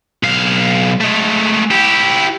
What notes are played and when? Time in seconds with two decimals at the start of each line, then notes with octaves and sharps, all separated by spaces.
0.23 B1 F5
1.01 G#3 A3
1.71 E4 G4